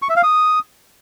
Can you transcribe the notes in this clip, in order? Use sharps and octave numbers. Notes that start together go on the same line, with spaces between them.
C#6
E5
F5
D#6